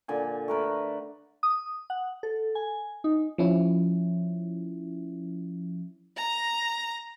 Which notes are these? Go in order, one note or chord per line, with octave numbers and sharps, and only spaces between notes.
A#2 D3 G#5
A3 A#4 B4
D#6
F#5
A4
G#5
D#4
F3 C#4 E4
A#5